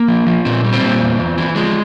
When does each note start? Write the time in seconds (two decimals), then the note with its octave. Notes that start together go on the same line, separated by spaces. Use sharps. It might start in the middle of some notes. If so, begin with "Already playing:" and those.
Already playing: A#3
0.08 F3
0.27 F3
0.45 A#2 C4
0.64 G3
0.73 C4
0.82 A#2
1.01 E2
1.19 E2
1.38 E3
1.56 F3 G#3